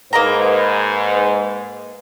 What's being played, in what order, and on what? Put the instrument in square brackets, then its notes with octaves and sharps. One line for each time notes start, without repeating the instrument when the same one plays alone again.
[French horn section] G#2 B4 [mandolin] A#3 D#5 A#5